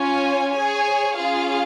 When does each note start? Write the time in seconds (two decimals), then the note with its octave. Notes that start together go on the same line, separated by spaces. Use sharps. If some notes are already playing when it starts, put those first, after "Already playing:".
Already playing: C#4 F4 C#5 G#5
0.53 G#4 C#5 G#5
1.17 C#4 F4 G#4 F5